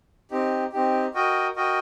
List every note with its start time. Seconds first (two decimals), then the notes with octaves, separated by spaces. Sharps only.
0.31 C4 D#4 G4
0.72 C4 D#4 G4
1.14 F#4 A#4 D#5 G5
1.55 F#4 A#4 D#5 G5